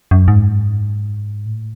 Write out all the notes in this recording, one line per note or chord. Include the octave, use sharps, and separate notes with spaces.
F#2
G#2
A2